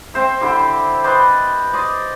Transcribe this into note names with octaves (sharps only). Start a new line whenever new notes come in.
C4 C5 E5
D3 E4 G4
B4 C5 D5 D#5
D5 D#5 C6